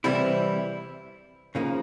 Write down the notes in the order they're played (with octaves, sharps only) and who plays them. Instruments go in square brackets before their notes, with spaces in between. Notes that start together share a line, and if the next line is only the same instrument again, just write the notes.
[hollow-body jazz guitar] C3 E3 G3 C4 E4
C#3 F3 A#3 D#4